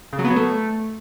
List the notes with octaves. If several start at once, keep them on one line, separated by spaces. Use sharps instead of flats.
C#3
F#3
B3
F#3
A3